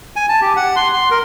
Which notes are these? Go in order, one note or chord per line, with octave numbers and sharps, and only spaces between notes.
G#5
A5
G4
F#5
C6
C6
A#4